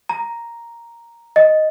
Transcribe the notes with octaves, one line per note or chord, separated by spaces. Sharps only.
A#5
D#5